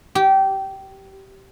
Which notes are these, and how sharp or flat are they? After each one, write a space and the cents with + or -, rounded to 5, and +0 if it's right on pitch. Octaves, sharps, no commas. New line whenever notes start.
G4 -20